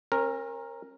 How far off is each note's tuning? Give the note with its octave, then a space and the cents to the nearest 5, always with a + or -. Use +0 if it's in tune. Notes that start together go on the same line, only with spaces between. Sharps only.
C#4 -45 A#4 +0